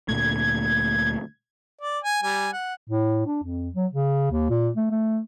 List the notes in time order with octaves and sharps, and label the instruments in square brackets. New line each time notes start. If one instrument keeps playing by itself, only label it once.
[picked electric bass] D2 A#2 A3 [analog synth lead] G#6
[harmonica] D5
G#5
G3 G#5
F#5
[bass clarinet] A2
D4
F2
F#3
C#3
D#2
A#2
A3
A3